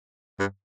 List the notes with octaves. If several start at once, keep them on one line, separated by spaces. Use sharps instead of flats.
G2